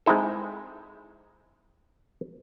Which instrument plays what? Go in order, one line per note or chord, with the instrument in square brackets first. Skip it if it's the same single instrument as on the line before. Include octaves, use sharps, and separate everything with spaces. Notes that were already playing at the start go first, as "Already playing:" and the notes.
[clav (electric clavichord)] G#3 C4 D#4 E4 A4